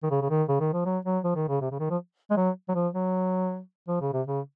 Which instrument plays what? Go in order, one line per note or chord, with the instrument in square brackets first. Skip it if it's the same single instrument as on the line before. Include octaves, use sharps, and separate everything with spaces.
[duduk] D#3
C#3
C#3
D#3
C#3
D#3
F3
F#3
F#3
F3
D#3
C#3
C3
C#3
D#3
F3
G#3
F#3
F#3
F3
F#3
F3
C#3
C3
C#3